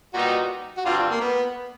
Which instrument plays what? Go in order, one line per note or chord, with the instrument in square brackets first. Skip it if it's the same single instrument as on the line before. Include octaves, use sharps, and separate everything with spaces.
[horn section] A#2 G3 B3 D#4 [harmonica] F#4
[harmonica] F#4
[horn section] G2 D3 G3 C4 [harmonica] F4
[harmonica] A#3
B3